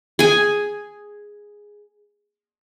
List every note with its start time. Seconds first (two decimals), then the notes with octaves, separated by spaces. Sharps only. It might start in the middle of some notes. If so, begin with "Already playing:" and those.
0.19 G#4 G#5